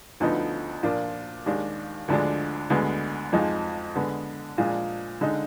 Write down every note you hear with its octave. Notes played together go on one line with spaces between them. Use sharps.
D2 D3 F3 B3 D#4
A#2 F3 A#3 D4 F4
D#2 D#3 G#3 D4
D2 D3 F3 G#3 D4
D2 D3 G#3 B3
F2 F3 G#3 D#4
D3 G#3 B3
A#2 F3 G#3 D4
D3 G#3 D#4